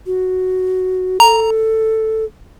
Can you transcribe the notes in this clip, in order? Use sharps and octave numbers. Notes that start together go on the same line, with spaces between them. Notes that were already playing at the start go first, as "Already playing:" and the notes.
F#4
A4 A#5